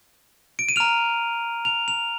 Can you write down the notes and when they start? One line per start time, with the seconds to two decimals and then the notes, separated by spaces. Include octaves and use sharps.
0.59 D7
0.69 D#7
0.76 A#5 F6 F7
1.65 F7
1.88 F7